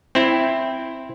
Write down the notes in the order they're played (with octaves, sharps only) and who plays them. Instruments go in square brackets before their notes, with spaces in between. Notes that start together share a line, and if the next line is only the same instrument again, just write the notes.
[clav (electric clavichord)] C4 E4